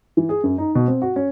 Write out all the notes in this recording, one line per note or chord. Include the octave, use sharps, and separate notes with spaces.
E3
G#4
F#2
D#4
B2
C4
F#4
C#4